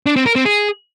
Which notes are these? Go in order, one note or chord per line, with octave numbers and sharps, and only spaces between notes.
D4
C4
A#4
C4
G#4